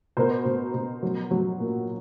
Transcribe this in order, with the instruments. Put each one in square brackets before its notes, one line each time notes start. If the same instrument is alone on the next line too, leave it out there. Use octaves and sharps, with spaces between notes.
[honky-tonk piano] B2 A#4 C5
B2
B2
F#3
F#3
A#2